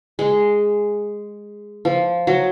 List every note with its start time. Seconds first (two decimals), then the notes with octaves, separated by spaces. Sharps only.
0.19 G#3
1.85 F3
2.27 F#3